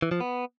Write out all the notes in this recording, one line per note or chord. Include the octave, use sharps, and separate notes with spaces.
E3
F3
B3